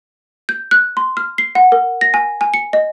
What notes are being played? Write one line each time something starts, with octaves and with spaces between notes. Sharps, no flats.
G6
F#6
C6
F6
C7
F#5
A#4
A#6
G#5
G#5
C#7
D#5